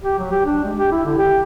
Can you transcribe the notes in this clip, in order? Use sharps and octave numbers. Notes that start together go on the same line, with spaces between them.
G4
F#3
G4
D4
G#3
G4
E4
D3
G4